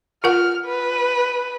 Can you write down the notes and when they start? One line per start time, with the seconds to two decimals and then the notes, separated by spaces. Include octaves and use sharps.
0.24 F4 A#4 F#5 F6
0.66 B4